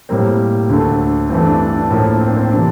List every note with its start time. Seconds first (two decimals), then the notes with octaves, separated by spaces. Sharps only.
0.09 A2 G3 A#3 C4
0.69 D2 D3 A3
1.30 G2 E3 A3 C4
1.45 D4
1.60 D4
1.75 D4
1.91 A2 F3 A#3
2.20 C4
2.29 D4
2.37 C4
2.51 C3 E3 D4